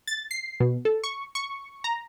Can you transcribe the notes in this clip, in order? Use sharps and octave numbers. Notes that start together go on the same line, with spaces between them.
A6
C7
B2
A4
C#6
C#6
A#5